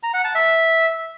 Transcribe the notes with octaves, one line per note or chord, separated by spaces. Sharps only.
A#5
F#5
A5
E5